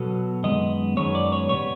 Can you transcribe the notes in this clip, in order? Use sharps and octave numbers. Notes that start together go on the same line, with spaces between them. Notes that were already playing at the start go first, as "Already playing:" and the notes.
Already playing: B2 F#3 B3 A4
F#2 D#3 G#3 B3 D#5
F#2 D#3 G#3 B3 C#5
D5
C#5
B2 G3 B3 C#5